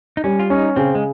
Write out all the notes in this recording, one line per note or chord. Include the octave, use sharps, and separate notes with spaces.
D#4
G3 C#4
F4
C#4 D#4
C#3 C4
G#3